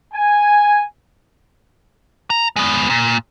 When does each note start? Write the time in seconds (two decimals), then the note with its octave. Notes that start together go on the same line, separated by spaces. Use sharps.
0.14 G#5
2.30 A#5
2.56 G#3 B3
2.90 A#2